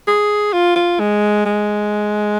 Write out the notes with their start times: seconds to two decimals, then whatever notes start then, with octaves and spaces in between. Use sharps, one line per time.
0.08 G#4
0.53 F4
0.76 F4
1.00 G#3
1.46 G#3